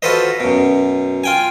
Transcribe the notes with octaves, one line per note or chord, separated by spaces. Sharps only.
F4 F#4 A4 B4 C5 D#5
F#2 B2
F4 G5 G#5